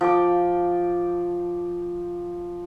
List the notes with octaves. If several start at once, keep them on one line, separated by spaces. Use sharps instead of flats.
F3 G5 D6